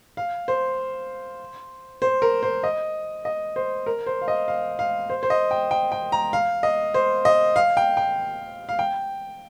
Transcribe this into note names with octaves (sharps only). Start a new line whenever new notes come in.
F5
C5
C5
A#4
C5
D#5
D#5
C5
A#4
C5
F5
D#5
F5
F5
C5
C5
D#5
G5
G5
G5
A#5
F5
D#5
C5
D#5
F5
G5
G5
F5
G5